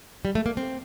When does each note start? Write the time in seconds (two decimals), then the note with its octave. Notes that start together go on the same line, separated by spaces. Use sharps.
0.25 G3
0.35 A3
0.46 A#3
0.57 C4